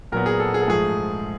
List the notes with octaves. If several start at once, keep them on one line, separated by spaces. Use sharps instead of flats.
A#2 F#3 B3 A#4
G#4
A4
G#4
A4
G#2 F3 A3 G#4